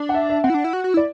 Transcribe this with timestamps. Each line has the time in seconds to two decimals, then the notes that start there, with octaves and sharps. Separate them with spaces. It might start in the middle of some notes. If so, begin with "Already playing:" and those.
Already playing: D4
0.09 F#5
0.14 E5
0.30 E5
0.44 C4 F#5
0.50 E4
0.54 D4
0.64 E4
0.73 F#4
0.84 F#4
0.94 E4
0.97 D5